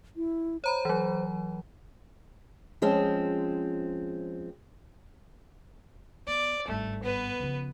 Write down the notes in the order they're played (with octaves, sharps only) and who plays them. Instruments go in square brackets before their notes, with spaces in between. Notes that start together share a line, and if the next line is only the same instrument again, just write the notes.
[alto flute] E4
[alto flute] C5 [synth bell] C#5 A#5 B5
[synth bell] E3 F#3
[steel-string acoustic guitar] F3 G#3 C4 C#4
[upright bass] B3 [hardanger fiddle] D5
[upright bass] G#1 G2 [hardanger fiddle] A3
[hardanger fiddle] B3 B4
[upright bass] C#3 F3